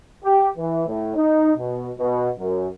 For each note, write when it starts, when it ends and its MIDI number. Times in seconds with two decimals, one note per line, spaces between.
0.24 0.48 67
0.57 0.83 52
0.87 1.15 45
1.16 1.52 63
1.57 1.90 47
1.99 2.29 47
2.39 2.67 42